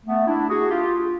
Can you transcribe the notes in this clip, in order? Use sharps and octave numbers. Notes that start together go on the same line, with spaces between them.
A3 B3
D4 E4
F#4 G#4
F4 G4